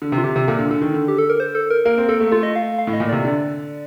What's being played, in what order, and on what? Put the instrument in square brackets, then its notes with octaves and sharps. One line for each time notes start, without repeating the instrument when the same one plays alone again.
[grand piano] D3
C3
[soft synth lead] F4
[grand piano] C3 [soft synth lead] G4
[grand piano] C3
[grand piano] A#2 [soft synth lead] A4
[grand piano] D3
[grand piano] D3 [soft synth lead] A4
[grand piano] D#3
D3
[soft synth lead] G4
A4
A#4
C5
A4
A#4
[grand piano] A#3 [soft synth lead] A#4
[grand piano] C4
[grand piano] A#3 [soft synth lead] A4
[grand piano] A3
[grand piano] A3 [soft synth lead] F4
[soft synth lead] D#5
F5
F5
[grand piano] A2
[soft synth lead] D#5
[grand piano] A#2
[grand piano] C3 [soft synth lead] D5
[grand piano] D3